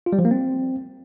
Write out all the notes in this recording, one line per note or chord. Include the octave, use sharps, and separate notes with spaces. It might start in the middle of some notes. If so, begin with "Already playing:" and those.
F4
G3
F3
A#3
C4